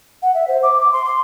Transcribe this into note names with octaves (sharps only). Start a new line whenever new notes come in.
F#5
E5
C5
D6
D6
C6
C6